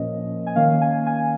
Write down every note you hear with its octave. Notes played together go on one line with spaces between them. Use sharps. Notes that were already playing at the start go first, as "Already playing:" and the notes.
Already playing: A#2 F3 A#3 C#4 D#5
G#5
D#3 A#3 C#4 F5
G#5
G#5